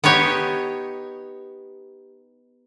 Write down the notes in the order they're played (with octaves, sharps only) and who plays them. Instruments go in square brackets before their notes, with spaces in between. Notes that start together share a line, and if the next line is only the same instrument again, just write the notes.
[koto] B3 D#4 G4 C#5